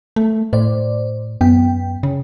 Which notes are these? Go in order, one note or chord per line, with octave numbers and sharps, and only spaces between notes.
A3
A2 C5 D5
F#2 B3 G5
C#3